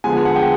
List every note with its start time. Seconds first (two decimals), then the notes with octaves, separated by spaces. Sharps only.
0.04 D3 F3 G#3 B3 G#5
0.25 F#5
0.36 G5